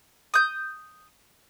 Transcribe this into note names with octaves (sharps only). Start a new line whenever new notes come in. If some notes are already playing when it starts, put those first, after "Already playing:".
D#6 G6